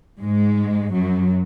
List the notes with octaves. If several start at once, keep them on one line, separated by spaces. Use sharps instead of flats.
G#2 G#3
F#2 F#3